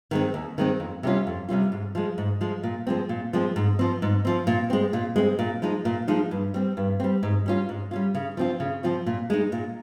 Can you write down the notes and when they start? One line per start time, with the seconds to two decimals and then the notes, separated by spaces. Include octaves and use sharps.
0.11 D#3 G#3 C4
0.34 D#2
0.58 D#3 G#3 C4
0.80 F2
1.03 C3 G3 C#4 F4
1.27 F2
1.49 C3 G3 C#4 F4
1.72 G#2
1.95 F3 G#3
2.18 G#2
2.41 F3 G#3
2.63 A#2
2.87 F3 G#3 C4
3.09 A#2
3.33 F3 G#3 C4
3.56 G#2
3.79 F3 C4
4.02 G#2
4.25 F3 C4
4.47 A#2
4.70 G#3 C4
4.93 A#2
5.16 G#3 C4
5.39 A#2
5.62 F3 G#3 D#4
5.85 A#2
6.08 F3 G#3 D#4
6.31 G2
6.54 G3 C4
6.77 G2
7.00 G3 C4
7.23 G#2
7.46 G3 C#4 F4
7.69 G#2
7.91 G3 C#4 F4
8.15 C#3
8.37 F3 C4 F4
8.60 C#3
8.83 F3 C4 F4
9.06 A#2
9.30 G#3 D#4
9.52 A#2